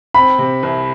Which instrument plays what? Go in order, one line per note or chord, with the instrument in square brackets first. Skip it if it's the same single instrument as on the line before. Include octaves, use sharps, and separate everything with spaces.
[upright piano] C4 [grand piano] B5
[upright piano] C3
C2